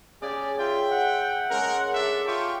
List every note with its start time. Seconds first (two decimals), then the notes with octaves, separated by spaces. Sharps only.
0.22 C#3 G4 G#4 D5 A5
0.59 F4 E5 G5
0.92 F#5
1.51 C#3 G#3 C#4 A#4
1.95 D4 A4 D5 E5
2.27 F4 G4 G5 C#6